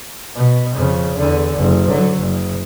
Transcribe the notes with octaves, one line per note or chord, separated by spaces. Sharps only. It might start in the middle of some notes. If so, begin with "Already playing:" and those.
B2
F2 C#3
E2 D3
F#1
D3 F#3
F#1